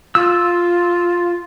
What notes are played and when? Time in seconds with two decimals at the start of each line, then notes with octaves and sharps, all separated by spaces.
0.15 F4 E6